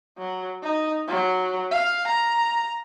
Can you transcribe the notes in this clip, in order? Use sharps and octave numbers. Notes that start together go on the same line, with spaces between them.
F#3
D#4
F#3
F5
A#5